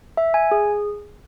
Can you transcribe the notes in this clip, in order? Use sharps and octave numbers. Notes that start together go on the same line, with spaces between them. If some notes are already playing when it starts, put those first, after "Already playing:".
E5
G#5
G#4